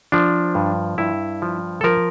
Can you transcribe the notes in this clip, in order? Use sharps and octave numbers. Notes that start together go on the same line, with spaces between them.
F3 D4
G2
G2 E4
F3
A4
F3 A#4